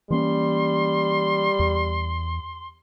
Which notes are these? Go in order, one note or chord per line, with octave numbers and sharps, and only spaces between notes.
E3 G3 A#3 C#4 C6
E2